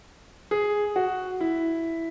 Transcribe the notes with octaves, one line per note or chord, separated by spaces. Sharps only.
G#4
F#4
E4